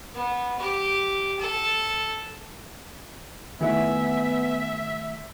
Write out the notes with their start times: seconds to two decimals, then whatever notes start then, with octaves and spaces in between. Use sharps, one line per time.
0.14 B3
0.59 G4
1.39 A4
3.61 D#3 A3 B3 E4 G#4 E5 F#5